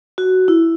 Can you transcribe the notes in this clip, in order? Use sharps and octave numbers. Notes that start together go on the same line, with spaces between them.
F#4
E4